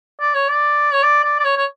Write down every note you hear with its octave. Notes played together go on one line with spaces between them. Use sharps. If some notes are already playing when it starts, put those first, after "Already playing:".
D5
C#5
D5
C#5
D5
D5
D5
C#5
C#5